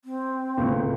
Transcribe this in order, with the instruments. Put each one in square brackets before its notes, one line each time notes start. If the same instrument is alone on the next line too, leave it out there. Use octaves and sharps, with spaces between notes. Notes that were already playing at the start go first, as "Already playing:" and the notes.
[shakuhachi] C4
[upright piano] C#2 A2